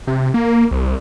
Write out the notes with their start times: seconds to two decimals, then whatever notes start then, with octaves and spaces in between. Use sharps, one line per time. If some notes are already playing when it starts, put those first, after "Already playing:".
0.07 C3
0.34 A#3
0.71 C2